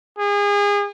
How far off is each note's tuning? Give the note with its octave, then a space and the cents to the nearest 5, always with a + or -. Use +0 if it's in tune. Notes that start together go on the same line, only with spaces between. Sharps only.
G#4 -30